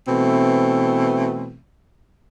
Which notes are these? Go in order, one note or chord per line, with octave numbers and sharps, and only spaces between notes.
B2 E3 A3 C4